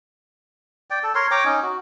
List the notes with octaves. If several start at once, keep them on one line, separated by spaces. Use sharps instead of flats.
D5 G5
A4
A#4 C#5 C6
C#5 G5 A#5 D6
C#4 D#4
F#4